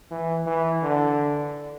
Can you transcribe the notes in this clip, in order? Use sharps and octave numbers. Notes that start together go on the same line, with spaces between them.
E3
E3
D3